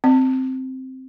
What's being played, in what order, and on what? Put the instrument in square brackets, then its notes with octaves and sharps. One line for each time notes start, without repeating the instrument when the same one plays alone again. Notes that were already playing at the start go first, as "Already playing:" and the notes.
[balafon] C4